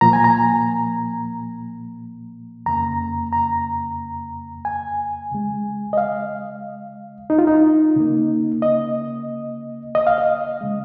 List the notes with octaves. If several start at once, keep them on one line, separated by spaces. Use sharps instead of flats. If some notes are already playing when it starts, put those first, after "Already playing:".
A#2 F3 A#3 A#5
G#5
A#5
F2 C#3 A#3 A#5
A#5
G#5
C#3 G#3
D#5
F5
D#4
F4
D#4
C#3 A#3
D#5
D#5
F5
D#5
C#3 G#3